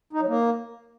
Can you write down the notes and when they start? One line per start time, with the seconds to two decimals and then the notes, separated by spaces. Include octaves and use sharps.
0.13 D#4
0.21 F#3
0.28 A#3